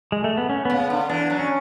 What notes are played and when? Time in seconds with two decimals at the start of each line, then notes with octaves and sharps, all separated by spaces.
0.12 G#3
0.24 A3
0.38 B3
0.50 C#4
0.65 C#3 B3
0.80 B3
0.90 D3
1.10 E3 D4
1.30 F#3
1.39 C#4